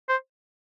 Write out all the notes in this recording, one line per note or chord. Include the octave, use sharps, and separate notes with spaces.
C5